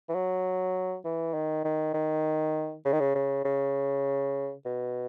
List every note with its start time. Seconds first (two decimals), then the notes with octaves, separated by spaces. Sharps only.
0.09 E3
0.15 F#3
1.05 E3
1.34 D#3
1.64 D#3
1.94 D#3
2.85 C#3
2.93 D#3
3.00 C#3
3.15 C#3
3.45 C#3
4.66 B2